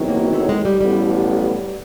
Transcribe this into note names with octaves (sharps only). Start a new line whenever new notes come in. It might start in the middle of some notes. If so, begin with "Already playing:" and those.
Already playing: E2 C3 D#3 F#3
A#3
A3
G#3
G3
A1 A2 F#3 G3 B3